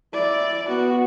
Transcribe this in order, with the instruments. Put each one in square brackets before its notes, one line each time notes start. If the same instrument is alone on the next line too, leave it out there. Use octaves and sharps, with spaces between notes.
[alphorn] E4 [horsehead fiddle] D5
[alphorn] B3 [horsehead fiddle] F#4